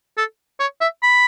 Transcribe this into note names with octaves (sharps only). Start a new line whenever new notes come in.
A4
C#5
E5
B5